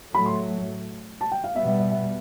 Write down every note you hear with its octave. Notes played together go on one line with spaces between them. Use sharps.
A2 F#3 A3 B5
C6
A5
G5
F5
B2 G3 B3 E5
E5
E5
E5